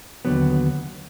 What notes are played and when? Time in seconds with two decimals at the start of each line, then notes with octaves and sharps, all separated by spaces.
0.25 D#2 D3 F#3 B3